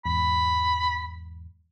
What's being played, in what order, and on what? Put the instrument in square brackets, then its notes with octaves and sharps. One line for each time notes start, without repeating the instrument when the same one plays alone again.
[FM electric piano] E2 G#2 [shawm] B5